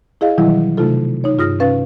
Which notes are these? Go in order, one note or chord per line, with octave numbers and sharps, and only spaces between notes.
E4 G#4 D#5 F5
B2 D#3 E3 F#3 G3 E4
C3 A3 D#4 F4 A4
D#4 C#5
G2 F4 G#4 D#6 F6 A#6
C3 C#4 B4 F5 A6